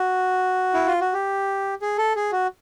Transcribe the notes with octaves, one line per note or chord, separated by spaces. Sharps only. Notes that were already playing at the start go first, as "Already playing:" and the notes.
Already playing: F#4
E4
F4
F#4
G4
G#4
A4
G#4
F#4